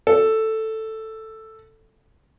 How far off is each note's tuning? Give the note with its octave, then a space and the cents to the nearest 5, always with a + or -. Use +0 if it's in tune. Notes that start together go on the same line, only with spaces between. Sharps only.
A4 +5